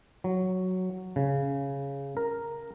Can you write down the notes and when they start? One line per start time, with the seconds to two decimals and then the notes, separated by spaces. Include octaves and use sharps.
0.24 F#3
1.16 C#3
2.17 A#4